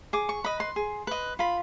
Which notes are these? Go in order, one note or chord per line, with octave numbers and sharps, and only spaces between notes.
G#4 D6
C#6
B4 D#5 B5
C6
G#4
B4 D#5
F4 B5